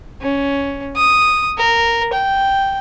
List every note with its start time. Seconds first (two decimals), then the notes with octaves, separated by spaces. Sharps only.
0.22 C#4
0.97 D#6
1.58 A#4
2.14 G5